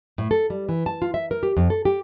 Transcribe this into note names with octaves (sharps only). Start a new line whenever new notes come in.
A2
A4
G3
E3
A5
F4
E5
A#4
G4
F2
A4
G4